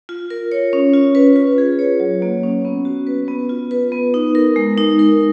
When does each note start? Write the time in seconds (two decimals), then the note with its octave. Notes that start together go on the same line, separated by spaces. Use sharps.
0.09 F4
0.30 A#4
0.52 C#5
0.73 C#4
0.93 F4
1.15 B4
1.36 F4
1.58 G#4
1.79 C#5
2.00 F#3
2.22 A#3
2.43 C#4
2.65 B3
2.85 F#4
3.07 B4
3.28 B3
3.49 F4
3.71 B4
3.92 B3
4.14 D#4
4.35 A#4
4.56 G#3
4.78 D#4
4.99 A#4